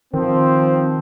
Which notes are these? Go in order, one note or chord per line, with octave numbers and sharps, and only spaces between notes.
D#3 F3 C4